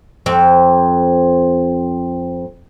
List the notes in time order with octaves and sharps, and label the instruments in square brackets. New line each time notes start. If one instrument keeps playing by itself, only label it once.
[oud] F2 C4